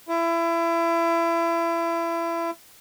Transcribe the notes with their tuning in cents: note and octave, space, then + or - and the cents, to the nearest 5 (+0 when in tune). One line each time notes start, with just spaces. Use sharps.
E4 +30